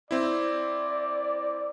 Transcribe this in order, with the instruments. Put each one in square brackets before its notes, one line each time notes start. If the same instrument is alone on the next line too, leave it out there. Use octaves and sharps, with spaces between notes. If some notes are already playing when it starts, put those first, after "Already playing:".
[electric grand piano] C4 E4 [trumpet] D5